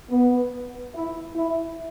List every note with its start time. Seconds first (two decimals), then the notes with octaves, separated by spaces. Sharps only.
0.11 B3
0.95 E4
1.36 E4